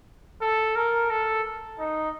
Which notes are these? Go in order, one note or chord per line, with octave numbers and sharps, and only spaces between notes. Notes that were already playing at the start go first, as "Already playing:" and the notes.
A4
A#4
A4
D#4